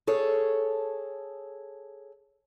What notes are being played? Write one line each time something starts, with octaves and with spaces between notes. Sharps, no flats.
G#4 A4 C#5